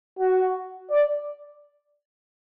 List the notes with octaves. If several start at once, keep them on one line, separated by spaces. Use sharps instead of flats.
F#4
D5